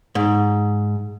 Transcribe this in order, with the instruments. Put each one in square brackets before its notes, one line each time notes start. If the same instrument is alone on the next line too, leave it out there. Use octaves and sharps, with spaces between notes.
[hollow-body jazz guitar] G#2